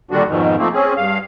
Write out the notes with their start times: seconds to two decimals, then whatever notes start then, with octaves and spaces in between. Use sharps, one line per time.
0.11 A#2 D3 D#3 G3 D4 F#4
0.27 F2 G#2 B2 D#3
0.58 F3 A3 A#3 C4
0.73 C4 C#4 G#4
0.97 G2 F5